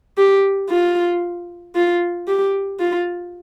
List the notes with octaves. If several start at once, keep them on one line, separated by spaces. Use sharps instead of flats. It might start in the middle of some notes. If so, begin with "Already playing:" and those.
G4
F4
F4
G4
F4